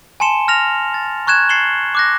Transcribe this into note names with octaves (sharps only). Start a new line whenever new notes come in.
G#5 A5 C6 C#7 E7 G7
F6 A#6 F7
A6
A#5 C#6 F#6 G#6 E7
A6 C7 C#7 E7 F#7 G7
D6 F#6 A#6